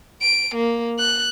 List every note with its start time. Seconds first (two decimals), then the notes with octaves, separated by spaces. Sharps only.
0.21 D7
0.55 A#3
0.99 F#6